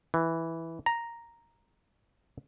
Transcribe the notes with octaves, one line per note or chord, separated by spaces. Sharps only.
E3
A#5